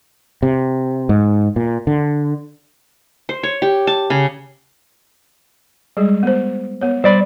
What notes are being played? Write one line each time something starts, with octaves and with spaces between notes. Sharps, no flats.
C3
G#2
A#2
D3
C5
C#5
G4
A5
C#3
G3 G#3 G#4
B3 C5
B3 C#5
G3 C5 D5 B5